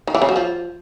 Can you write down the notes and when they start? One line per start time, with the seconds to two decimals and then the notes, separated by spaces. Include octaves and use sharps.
0.07 D#3
0.15 E3
0.22 C#3
0.29 F#3
0.36 F3